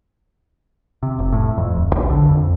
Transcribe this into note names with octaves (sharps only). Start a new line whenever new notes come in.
C3
F1
A2
F2
D1
A#1
D3
F2